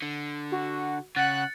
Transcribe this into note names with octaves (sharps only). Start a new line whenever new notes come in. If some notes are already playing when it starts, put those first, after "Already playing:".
D3
F#4
C#3 F#5 F#6 A6 C#7